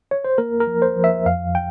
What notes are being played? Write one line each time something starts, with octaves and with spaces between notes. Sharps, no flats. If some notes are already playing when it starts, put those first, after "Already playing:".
C#5
C5
A#3 A#4
A#4
F3
C5
F3
E5
F2 F5
G5